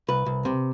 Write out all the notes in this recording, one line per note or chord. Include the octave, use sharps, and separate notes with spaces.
C2 B4
C2
C3